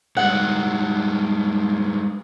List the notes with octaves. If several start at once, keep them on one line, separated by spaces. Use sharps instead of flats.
G#2 G3 F#5